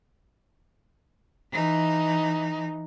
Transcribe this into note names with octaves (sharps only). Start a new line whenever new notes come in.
E3 D#4